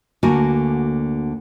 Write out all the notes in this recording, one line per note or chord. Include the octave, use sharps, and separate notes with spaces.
D2 D3 A#3 F#4 G#5